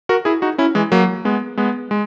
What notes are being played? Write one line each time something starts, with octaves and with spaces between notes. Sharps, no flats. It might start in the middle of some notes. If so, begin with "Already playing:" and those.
F#4 A#4
E4 G#4
D#4 F#4
C#4 E4
E3 G#3
F#3 A#3
G#3 B3
G#3 B3
G#3